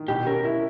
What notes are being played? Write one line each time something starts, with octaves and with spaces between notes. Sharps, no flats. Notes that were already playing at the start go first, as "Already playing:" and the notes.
Already playing: D#3
B2 G4
C#4 A#4
E4